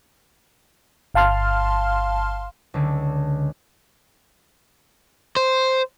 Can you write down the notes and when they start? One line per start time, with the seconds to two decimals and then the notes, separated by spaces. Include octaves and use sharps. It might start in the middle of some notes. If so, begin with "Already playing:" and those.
1.14 G1 F5 A5 C6 F6
2.74 C#2 D3
5.36 C5